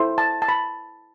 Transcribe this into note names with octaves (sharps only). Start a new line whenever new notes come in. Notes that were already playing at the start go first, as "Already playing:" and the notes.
Already playing: E4 A4 C5
A5
A5
B5